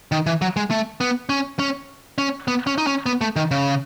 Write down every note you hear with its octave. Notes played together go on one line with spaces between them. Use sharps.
D#3
E3
F#3
G#3
A3
B3
C#4
C#4
C#4
B3
C#4
D#4
C#4
B3
A3
D#3
C#3